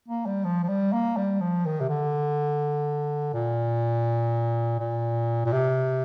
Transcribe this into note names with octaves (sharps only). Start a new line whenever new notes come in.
A#3
G3
F3
F3
G3
A#3
G3
F3
D#3
C3
D3
A#2
A#2
A#2
C3